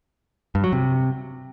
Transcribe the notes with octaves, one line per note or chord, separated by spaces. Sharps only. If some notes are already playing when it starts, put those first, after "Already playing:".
G2
F#3
C3